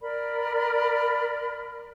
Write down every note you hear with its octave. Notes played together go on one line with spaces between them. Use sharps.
A#4 D5 B5